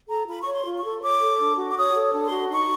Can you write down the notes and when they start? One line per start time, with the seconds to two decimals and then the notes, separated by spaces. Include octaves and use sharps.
0.08 A4 A#5
0.27 F4 B5
0.41 C#5 C#6
0.52 C6
0.64 F4
0.77 C#6
0.83 A4
1.01 C#5 D6
1.20 A4
1.39 D4
1.57 F#4
1.69 D6
1.76 C#5 D#6
1.95 A4
2.13 D4
2.25 C6
2.31 F#4
2.50 D#4 C#6